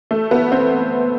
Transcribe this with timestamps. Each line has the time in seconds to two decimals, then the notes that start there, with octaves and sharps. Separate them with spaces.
0.11 A3
0.31 B3
0.52 C4